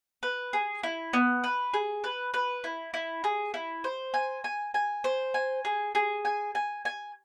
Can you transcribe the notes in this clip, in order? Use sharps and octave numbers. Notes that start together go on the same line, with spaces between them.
B4
G#4
E4
B3
B4
G#4
B4
B4
E4
E4
G#4
E4
C5
G#5
G#5
G#5
C5
G#5
G#4
G#4
G#5
G#5
G#5